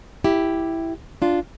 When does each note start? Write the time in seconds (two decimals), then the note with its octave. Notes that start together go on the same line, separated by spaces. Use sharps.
0.24 E4 G4
1.22 D4 F4